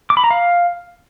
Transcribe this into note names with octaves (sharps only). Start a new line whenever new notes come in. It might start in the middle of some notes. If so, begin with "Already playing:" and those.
D6
B5
A#5
F5